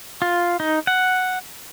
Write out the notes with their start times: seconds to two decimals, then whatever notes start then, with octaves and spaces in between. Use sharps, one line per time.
0.22 F4
0.60 D#4
0.87 F#5